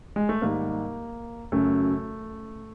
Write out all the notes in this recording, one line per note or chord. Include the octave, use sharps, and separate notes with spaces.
G#3
A3
G#2 D#3 G3 A#3
F#2 C#3 F#3 A3